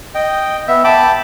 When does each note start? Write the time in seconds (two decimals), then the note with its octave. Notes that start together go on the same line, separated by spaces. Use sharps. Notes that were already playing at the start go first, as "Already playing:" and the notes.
0.15 D#5 G5
0.68 B3 E5
0.84 G5 A5 B5 D6